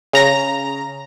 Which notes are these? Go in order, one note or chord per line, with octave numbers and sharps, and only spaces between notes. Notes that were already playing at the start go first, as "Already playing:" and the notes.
C#3 A#5 A#6